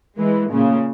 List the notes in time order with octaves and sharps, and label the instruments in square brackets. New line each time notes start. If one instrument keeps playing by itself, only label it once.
[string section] E3 G#3
A#2 C#3